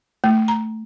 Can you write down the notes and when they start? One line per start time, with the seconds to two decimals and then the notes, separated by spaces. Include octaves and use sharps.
0.24 A3
0.48 A#5